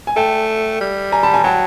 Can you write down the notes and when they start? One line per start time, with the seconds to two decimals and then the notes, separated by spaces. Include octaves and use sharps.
0.07 G#5
0.16 A3 G5 A5
0.81 G3
1.12 G#5 A#5
1.23 A5 B5
1.34 G#5 A#5
1.44 F#3 G5 A5